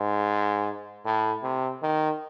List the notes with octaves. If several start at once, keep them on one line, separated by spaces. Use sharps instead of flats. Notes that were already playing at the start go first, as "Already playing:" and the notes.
Already playing: G#2
A2
C3
D#3